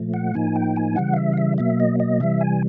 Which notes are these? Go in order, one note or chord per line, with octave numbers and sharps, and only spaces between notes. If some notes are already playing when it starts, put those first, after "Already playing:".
Already playing: A#2 F3 A3
F#5
A2 F3 A#3 D#4 G#5
G5
G#5
C#3 E3 G3 F#5
F5
E5
F5
E5
B2 F#3 A#3 E5
D#5
D#5
C3 E3 G3 E5
G#5